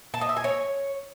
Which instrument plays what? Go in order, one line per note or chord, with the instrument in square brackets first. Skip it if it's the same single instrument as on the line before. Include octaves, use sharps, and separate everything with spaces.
[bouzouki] A5
D#5
E5
G#5
C#5